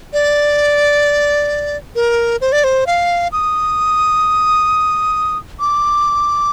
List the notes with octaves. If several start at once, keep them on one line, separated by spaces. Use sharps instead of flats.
D5
A#4
C5
D5
C5
F5
D#6
D6